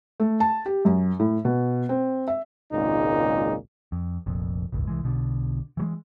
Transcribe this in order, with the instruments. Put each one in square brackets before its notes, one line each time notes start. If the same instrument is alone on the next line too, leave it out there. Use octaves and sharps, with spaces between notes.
[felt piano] A3
A5
G4
F#2
A2
B2
C4
E5
[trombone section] G#1 C#2 A#2 D#4
[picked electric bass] F2
F1 A#1 F2
D#1 G#1 C#2
C2 E3 G#3
B1 B2 D3
E3 F#3 G#3